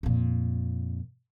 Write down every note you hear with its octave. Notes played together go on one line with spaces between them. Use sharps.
F2 A#2